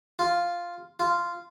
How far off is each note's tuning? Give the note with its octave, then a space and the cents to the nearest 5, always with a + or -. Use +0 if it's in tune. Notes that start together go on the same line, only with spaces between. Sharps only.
F4 +0
F4 -10